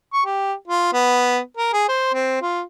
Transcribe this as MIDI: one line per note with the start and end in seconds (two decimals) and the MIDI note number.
0.13 0.22 85
0.26 0.53 67
0.68 0.88 65
0.93 1.39 59
1.57 1.73 70
1.73 1.88 68
1.89 2.09 72
2.14 2.37 60
2.42 2.61 65